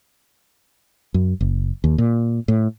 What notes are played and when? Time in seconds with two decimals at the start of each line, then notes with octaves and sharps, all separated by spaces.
1.14 F#2
1.41 F#1
1.84 D#2
1.98 A#2
2.48 A2